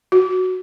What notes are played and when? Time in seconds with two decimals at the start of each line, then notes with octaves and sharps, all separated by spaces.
0.12 F#4